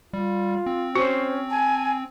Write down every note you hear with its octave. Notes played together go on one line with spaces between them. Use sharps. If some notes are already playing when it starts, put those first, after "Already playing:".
G3 F4
C4
C#4 F#4 C5
G#5 A5